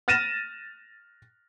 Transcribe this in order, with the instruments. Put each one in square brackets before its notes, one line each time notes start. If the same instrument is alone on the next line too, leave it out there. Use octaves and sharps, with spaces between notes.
[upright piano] F6 A6 A#6 D#7 E7